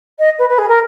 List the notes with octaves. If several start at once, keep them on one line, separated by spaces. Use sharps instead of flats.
D#5
B4
B4
G#4
A#4